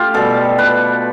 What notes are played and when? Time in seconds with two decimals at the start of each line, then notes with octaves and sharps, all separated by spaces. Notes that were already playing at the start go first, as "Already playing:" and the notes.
Already playing: A3 F4 G4
0.14 B2 G3 A4
0.59 B4